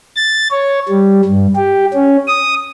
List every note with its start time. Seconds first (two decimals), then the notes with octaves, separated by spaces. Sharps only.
0.16 A6
0.51 C#5
0.89 G3
1.25 G2
1.56 G4
1.94 C#4
2.28 D#6